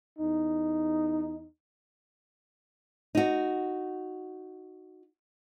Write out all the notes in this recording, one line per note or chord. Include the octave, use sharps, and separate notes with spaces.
E2 D#4
D#4 F#4